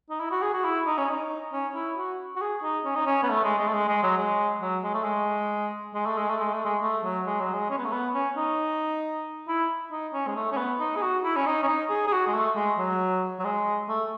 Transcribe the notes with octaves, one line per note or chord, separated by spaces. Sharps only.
D#4
E4
F#4
G#4
F#4
E4
D#4
C#4
D#4
C#4
E4
F#4
F#4
G#4
D#4
C#4
D#4
C#4
B3
A3
G#3
G#3
A3
G#3
G#3
F#3
G#3
F#3
G#3
A3
G#3
G#3
A3
G#3
A3
G#3
A3
G#3
A3
F#3
G#3
F#3
G#3
C#4
B3
A3
B3
C#4
D#4
E4
D#4
C#4
G#3
A3
C#4
B3
D#4
G#4
F#4
E4
C#4
D#4
C#4
D#4
G#4
G#4
F#4
G#3
A3
G#3
F#3
F#3
G#3
A3